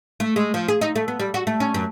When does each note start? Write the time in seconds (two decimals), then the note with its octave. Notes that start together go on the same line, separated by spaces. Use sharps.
0.20 A3
0.36 G#3
0.54 F3
0.68 G#4
0.81 D#4
0.96 A3
1.08 B3
1.20 G3
1.34 F#4
1.47 A3
1.60 C#4
1.74 F#2